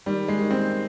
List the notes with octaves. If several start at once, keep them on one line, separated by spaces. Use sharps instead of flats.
D#3 G3
G#3
D#3
C4